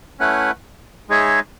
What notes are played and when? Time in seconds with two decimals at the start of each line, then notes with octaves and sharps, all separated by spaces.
0.19 A3 C#4 E4 B4 F#5
1.09 G#3 D#4 G#4 C#5 E5